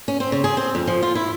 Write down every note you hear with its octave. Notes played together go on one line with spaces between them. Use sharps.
C#4
C4
C#3
G#4
C4
F2
F3
F4
E4